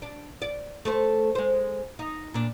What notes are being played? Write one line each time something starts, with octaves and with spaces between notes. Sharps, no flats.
D4
D5
A3 A4 C5
G#3 C5
D#4
A#2 D4